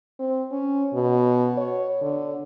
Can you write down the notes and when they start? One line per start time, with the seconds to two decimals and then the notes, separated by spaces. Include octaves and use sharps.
0.19 C4
0.52 C#4
0.94 B2
1.57 C#5
2.01 D3